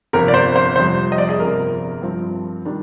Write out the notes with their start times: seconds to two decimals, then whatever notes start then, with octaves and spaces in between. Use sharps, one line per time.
0.13 G1 F2 C3 A#4
0.28 D5
0.34 C5
0.56 C5
0.76 F2 C3 G3 C5
1.12 D#5
1.18 D5
1.29 G#4
1.38 G1 F2 C3 A#4
2.02 G2 F3 C4
2.65 D#3 G3 D4